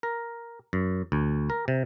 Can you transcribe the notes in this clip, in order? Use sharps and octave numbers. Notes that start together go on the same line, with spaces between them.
A#4
F#2
D2
A#4
C3